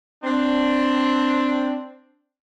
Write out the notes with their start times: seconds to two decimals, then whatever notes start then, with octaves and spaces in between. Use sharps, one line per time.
0.23 C4 D4